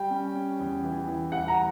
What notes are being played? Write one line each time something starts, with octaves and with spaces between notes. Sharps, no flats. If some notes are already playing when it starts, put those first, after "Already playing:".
Already playing: G3 G5
C#4
C#4
E2
E3
E3
G3 F#5
A#5